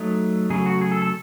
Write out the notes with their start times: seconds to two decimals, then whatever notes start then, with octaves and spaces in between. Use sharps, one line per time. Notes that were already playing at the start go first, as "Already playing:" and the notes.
Already playing: F#3 A3 D#4 A4
0.50 C#3 F#3 A3 G#4
0.66 F#4
0.81 G#4
0.92 A4
1.02 A4